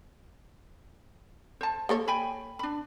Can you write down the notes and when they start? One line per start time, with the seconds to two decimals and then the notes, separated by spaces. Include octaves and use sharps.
1.61 C5 A5
1.89 A#3 A4 C#5
2.08 G5 G#5 B5
2.59 D4 B5